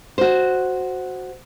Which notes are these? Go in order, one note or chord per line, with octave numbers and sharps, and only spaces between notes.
F#4 C5